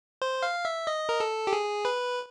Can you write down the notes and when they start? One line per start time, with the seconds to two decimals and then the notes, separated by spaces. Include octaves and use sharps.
0.22 C5
0.43 F5
0.65 E5
0.87 D#5
1.09 A#4
1.20 A4
1.47 G4
1.53 G#4
1.85 B4